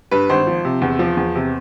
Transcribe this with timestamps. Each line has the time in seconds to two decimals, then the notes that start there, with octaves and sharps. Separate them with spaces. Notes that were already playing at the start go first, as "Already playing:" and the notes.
0.11 G2 B4
0.29 G#1 C5
0.47 F3
0.65 C3
0.82 E2
0.99 F3
1.17 E2
1.35 C3